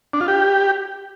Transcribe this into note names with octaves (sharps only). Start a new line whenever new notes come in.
D4
F4
G4